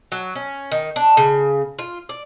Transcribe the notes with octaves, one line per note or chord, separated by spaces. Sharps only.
F#3
C#4
D#3
D4
C#3
F4
D5